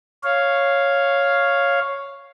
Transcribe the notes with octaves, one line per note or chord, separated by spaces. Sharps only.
C#5 F5